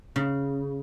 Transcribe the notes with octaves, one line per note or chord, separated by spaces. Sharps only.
C#3